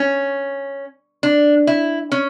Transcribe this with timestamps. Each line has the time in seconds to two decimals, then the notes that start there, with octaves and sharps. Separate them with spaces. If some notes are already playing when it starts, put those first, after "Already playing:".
Already playing: C#4
1.23 D4
1.67 E4
2.12 C#4